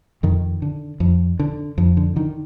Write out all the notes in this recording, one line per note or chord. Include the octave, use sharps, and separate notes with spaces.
F2 D#3
D3
F2
D3
F2
D3
D3 D#3